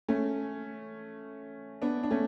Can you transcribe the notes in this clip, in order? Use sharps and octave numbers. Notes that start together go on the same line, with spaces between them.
A3 C#4
B3 D4
D4
A3 C#4